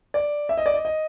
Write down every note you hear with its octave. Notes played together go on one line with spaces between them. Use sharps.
D5
E5
D#5
D5
D#5
D#5